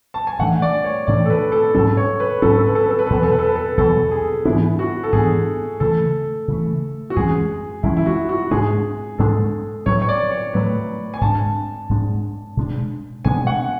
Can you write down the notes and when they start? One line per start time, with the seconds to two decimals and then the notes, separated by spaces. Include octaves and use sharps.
0.14 A5
0.27 G#5
0.39 A2 E3 A3 D4 F#5
0.62 D5
0.84 C#5
1.07 A2 E3 A3 D4 D5
1.26 A4
1.30 B4
1.52 A4
1.75 G#2 F#3 C#4 A4
1.97 C#5
2.20 B4
2.42 G#2 F#3 C#4 A4
2.50 B4
2.59 A4
2.66 B4
2.75 A4
2.83 B4
2.91 A4
2.99 B4
3.07 A4
3.10 E2 B2 F#3 B4
3.23 A4
3.32 B4
3.39 A4
3.47 B4
3.55 A4
3.77 E2 B2 F#3 A4
4.11 G#4
4.45 G#2 E3 B3 D4 E4
4.79 F#4
5.04 A4
5.13 G#2 E3 B3 D4 G#4
5.80 C#3 E3 A3 A4
6.48 C#3 E3 A3
7.10 F#4
7.16 F#2 E3 G#3 C#4 G#4
7.83 F#2 E3 G#3 C#4 E4
7.97 E4
8.06 F#4
8.29 F#4
8.51 G#2 G#3 D4 G#4
9.18 G#2 G#3 D4 A4
9.86 A2 F#3 A3 C#5
10.02 C#5
10.09 D5
10.31 C#5
10.54 A2 F#3 A3 B4
11.14 G#5
11.21 G#2 G#3 D4 A5
11.89 G#2 G#3 D4
12.57 B2 G#3 B3 D4
13.25 B2 G#3 B3 D4 G#5
13.47 F#5